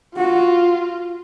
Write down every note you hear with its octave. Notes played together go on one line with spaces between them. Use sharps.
F4 F#4